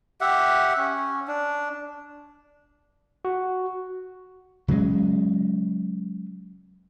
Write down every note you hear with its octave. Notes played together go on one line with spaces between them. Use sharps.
G4 E5 F#5
C#4
D4
F#4
C#3 F#3 G#3